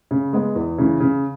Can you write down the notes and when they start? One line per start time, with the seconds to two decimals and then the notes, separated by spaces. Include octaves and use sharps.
0.11 C#3
0.33 G#3 B3
0.56 E2
0.78 C#3 E3
1.00 C#3